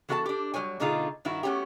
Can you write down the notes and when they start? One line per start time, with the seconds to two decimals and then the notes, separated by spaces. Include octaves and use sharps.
0.09 E3 B3 F#4 A4 E5 A5
0.26 D4 G4
0.54 F#3 G3 B4 C#5 G#5
0.80 B2 D3 A3 D#4 F4 G#4
1.25 G2 D#3 E4 F#4
1.43 A3 B3 C#4 F#4 G4